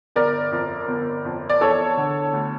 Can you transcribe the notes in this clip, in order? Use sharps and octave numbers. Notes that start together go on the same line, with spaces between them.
G1 A#4 D5
F2
G1
F2
D5
E2 A4 C#5
D3
D2